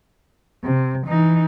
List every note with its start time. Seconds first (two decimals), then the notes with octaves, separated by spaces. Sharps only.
0.64 C3
1.07 E3 D#4